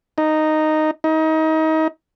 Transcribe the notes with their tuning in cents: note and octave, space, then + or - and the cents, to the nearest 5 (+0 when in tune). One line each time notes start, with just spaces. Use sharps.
D#4 -5
D#4 +30